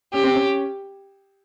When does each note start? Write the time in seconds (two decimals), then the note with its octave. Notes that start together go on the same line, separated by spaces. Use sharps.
0.13 C#4 G4
0.24 C4
0.34 C#4